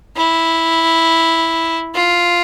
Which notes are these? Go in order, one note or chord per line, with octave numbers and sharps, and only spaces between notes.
E4
F4